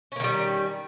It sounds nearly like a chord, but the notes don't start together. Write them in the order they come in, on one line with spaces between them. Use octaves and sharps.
C#4 A#3 D#3 G3